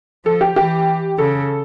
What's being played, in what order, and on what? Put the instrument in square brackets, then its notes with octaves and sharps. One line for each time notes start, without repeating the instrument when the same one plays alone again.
[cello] F3 [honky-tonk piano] A4
[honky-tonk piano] G4
[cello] E3 [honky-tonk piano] G4
[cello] C#3 [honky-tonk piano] A4